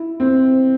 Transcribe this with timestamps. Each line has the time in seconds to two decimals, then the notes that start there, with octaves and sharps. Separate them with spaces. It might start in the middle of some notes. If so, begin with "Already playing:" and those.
Already playing: E4
0.20 C4